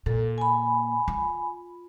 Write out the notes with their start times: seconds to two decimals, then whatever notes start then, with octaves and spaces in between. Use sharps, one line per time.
0.06 A#2 A4
0.38 G#5 B5
1.08 F4